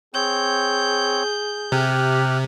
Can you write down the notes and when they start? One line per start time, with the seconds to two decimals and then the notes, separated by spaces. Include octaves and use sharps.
0.14 C4 G#4 C#5 G6
1.72 C3 G4 F6 F#6